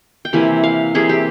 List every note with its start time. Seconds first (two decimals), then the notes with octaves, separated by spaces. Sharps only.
0.25 G5
0.33 C3 E3 A#3 E4 G#5
0.64 F5
0.94 C3 E3 A#3 E4 G#4
1.09 G4